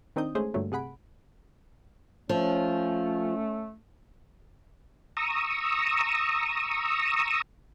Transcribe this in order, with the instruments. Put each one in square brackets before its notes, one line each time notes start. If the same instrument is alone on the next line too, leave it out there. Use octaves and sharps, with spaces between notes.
[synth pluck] D#3 C4 D4 D#4 D#6 G6
G#3 A3 C#4 G#4 C5
G2 A#2 D3 F#3 A3
C3 G#4 F#5 B5 D7
[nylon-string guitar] F3 [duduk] A3 [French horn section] C#4
[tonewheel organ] A#5 C#6 D#6 E6